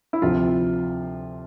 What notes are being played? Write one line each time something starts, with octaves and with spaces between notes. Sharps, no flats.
E4
D2 C3 F3 F4